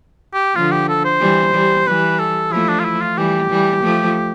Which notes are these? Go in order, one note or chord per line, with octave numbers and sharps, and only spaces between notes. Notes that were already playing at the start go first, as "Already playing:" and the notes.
G4
D3 F3 F4
G4
A4
C5
E3 G3
E3 G3
E3 G3 B4
A4
F3 A3 E4
D4
F4
E4
F4
E3 G3 G4
E3 G3
F3 A3